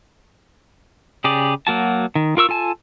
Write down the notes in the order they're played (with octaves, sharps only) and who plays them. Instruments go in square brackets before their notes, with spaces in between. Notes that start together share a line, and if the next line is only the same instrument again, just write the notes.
[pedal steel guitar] C#3 G4 G#4 D5
F#3 A#3 F#4 A5
D#3
F4 A#4 C#6 E6
F4 A4 G#5 A5